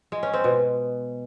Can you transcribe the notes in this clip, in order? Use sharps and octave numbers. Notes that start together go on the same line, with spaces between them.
G#3
C#4
C4
B2